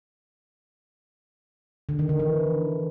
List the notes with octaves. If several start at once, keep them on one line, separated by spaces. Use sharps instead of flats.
D3
D#3
D3
E3